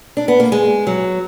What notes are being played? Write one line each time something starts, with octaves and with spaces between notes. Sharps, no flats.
D4
B3
A#3
G#3
F#3